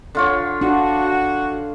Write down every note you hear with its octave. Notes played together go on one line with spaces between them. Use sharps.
D3 F4 C#5
D4 F#4